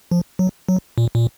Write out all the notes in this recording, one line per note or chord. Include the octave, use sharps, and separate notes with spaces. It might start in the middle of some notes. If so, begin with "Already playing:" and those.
F3
F#3
F#3
A#2
A#2